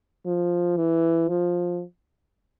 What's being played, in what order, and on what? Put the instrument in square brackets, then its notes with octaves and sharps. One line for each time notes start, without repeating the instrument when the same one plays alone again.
[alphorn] F3
E3
F3